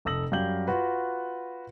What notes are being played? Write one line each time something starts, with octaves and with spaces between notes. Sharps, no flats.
F1 A4 D#6 E6 A#6 F#7
F#2 G3 G4 F5 G6 F#7
F4 F#4 B4